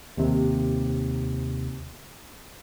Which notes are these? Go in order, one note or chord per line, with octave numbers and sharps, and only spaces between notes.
D#2 C3